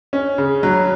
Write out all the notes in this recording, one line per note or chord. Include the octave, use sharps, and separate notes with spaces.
C#4
C#3
F#3